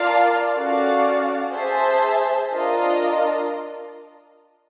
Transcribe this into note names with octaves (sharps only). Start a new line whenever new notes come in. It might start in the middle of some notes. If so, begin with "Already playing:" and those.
Already playing: F4 A#4 D5 F5 A5
C#4 F#4 A4 D5 F5
G#4 C5 E5 A5
D4 F4 A#4 D#5